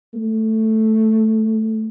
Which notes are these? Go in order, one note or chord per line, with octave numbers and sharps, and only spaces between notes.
A3